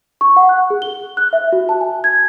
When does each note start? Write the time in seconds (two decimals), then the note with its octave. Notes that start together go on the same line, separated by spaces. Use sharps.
0.21 C#6
0.37 F#5
0.49 F#6
0.70 G#4
0.82 G7
1.17 F#6
1.33 E5
1.52 F#4
1.69 A5
1.81 G#5
2.04 G#6